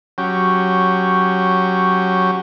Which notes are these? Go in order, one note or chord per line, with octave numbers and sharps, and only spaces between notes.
F#3 C#4 G4